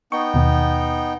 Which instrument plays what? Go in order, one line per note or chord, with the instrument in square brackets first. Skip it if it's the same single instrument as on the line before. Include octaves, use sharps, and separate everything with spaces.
[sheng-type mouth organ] B3 D#4 G5 [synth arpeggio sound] C#6
[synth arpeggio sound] D#2 B2 D#3